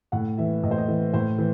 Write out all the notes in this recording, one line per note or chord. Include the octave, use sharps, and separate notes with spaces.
A2 F#5
E3 E5
A2 D#5
C5
D#5
E3
A2 C5
E3